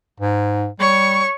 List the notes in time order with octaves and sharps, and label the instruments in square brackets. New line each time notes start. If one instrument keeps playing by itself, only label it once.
[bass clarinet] G#2
[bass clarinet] G3 [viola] C#5 C#6